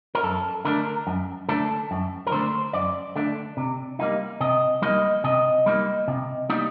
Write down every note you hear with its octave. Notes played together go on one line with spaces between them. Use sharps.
A#4
F#2 A4
D3 A3 D4 A#4
F#2
D3 A3 D4 A4
F#2
A#4
D3 A3 D4 C5
F#2 D5
D3 A3 D4
C3
G3 A#3 D#4
C3 D#5
G3 A#3 D#4 D#5
C3 D#5
G3 A#3 D#4
C3
G3 A#3 D#4